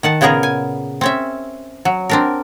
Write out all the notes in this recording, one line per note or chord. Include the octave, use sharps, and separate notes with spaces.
D#3 F#5 A5
A#2 C#3 B3 G#4 A#4 A#5
G#5
C4 C#4 E5
F#3
C4 D4 A#4